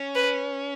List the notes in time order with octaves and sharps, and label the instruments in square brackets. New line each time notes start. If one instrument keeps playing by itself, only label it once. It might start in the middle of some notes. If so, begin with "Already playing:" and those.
Already playing: [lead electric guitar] C#4
[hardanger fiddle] B4